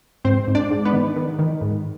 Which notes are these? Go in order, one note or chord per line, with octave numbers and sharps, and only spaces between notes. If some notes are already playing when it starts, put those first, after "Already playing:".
G#2 C4 C5
G#2
D4 D5
G#2
B3 B4
D#3
D#3
D#3
G#2